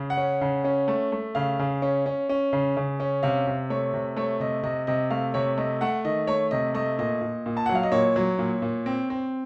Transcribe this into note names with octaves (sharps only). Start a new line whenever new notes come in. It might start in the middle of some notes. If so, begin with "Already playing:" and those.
Already playing: C#3
F#5
C#4
C#3
C#4
A3
A3
C#3 F5
C#3
C#4
C#4
C#4
C#3
C#3
C#4
C3 F5
C3
A3 C#5
C3
A3 C#5
C3 D#5
C3 D#5
C3 D#5
A3 F5
C3 C#5
A3 D#5
A3 F#5
D#3 D#5
A3 C#5
C3 D#5
A3 D#5
A#2 D#5
A#2
A#2
A5
F#3 F#5
F5
D#5
A#2 C#5
F#3
A#2
A#2
C4
C4